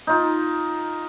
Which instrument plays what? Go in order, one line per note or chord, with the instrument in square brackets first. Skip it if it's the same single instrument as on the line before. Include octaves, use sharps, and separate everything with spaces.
[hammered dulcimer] D#4 F4